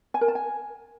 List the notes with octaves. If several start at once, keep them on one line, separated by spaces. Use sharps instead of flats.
G#5
A#4
A5
G#5